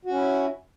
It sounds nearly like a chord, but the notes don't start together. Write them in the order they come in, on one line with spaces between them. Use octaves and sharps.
F#4 C#4 E4